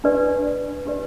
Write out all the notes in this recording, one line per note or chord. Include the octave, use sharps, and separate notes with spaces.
D4 G4 B4 D5
D4 G4 B4 D5